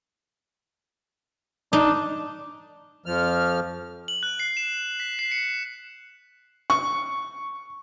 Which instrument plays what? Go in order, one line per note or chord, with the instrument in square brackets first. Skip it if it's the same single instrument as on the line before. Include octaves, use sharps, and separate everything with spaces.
[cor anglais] D4 [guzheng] D#4
[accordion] F2 F3 F6
[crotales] F#7
F#6
C7
E7
B6
C7
C#7
[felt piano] C#6